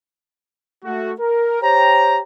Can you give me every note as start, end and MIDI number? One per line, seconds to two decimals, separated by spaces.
0.84 1.12 57
0.84 1.12 66
1.20 1.60 70
1.61 2.20 67
1.61 2.20 72
1.61 2.20 73
1.61 2.20 79
1.61 2.20 82